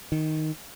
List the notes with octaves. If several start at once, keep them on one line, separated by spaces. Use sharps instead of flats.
D#3